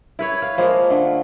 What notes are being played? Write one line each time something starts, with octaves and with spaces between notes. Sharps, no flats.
E4 B4 C#5
B4 F5
F3 G#3 A#3
D3 A3